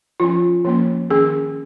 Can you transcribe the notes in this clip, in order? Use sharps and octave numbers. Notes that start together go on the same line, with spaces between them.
F3 C#4 F4
F3 A#3 C#4
D#3 C#4 G#4